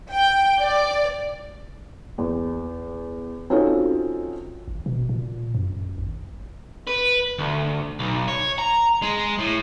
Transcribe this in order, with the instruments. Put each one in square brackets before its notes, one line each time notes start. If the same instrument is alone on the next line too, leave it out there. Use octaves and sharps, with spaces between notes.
[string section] G5
D5
[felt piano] E2
C4 C#4 D#4 F4 F#4 A4
[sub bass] G#1
B2
A#2
F#2
G#1
[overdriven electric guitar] B4
D2
B1
C#5
A#5
G#3
A2